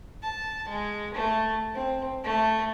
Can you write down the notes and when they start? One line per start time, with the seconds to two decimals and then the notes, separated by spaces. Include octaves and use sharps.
0.23 A5
0.68 G#3
1.14 A3
1.74 C4
2.24 A3